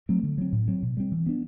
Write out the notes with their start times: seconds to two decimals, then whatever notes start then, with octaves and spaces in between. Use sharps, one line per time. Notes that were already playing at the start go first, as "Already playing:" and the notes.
0.09 F#3 A3 C4
0.23 D3
0.38 F#3 C4
0.53 A2
0.68 F#3 C4
0.83 B2
0.97 G3 C4
1.12 E3
1.26 B3 D4